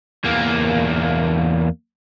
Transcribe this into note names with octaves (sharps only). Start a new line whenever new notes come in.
E2 A#3